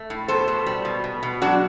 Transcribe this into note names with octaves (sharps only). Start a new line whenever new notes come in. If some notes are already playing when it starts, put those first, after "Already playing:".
Already playing: A3
A2
B2 A4 C5
B2
G3
B2
B2
B2
F#3 D4 F#4